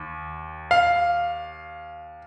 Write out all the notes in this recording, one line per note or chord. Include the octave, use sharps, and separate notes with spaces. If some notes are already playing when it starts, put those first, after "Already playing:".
Already playing: D#2
F5